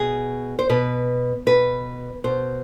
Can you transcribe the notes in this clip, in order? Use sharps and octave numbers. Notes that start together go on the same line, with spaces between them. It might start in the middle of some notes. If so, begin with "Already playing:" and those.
Already playing: B2 G#4
C5
B2 B4
B2 B4
B2 C5